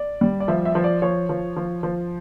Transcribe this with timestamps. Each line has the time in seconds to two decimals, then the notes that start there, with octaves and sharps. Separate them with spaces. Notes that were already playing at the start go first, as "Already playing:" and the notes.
Already playing: D5
0.21 G3
0.40 D5
0.48 F3 E5
0.65 E5
0.75 F3
0.84 D5
1.02 F3 C#5
1.29 F3
1.56 F3
1.83 F3